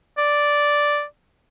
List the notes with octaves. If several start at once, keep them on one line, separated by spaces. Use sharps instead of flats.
D5